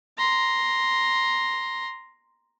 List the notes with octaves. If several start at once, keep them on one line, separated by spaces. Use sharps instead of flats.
A#5 C6